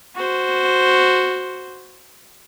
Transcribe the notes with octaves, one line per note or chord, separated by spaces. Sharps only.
F#4 C5